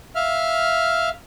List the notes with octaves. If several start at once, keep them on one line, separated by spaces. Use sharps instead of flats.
E5 F5 F6